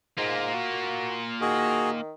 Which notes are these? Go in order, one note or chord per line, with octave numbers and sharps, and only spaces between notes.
G#2 A#3 F4
F#4
D#3 F#4 G#4